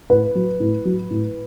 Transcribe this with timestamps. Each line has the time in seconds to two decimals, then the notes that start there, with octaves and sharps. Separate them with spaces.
0.09 A2 B4
0.35 F#3
0.60 A2
0.85 F#3
1.10 A2